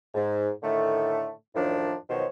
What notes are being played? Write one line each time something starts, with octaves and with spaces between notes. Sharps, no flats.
G#2
A2 D3 D#3 A3
F#2 A2 D#3 F3 D4
B2 D#3 F3 F#3 C5 C#5